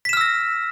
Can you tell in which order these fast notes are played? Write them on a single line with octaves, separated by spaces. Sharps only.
B6 E7 F6 E6 A#6